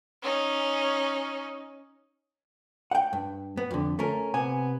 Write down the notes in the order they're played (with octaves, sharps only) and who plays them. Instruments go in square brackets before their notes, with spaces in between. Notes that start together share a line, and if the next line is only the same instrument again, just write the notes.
[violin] C#4 D#4
[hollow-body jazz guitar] F#5 G5
G2
B3
F2 D3
A3 C#4 A#4
C3 B3 G#5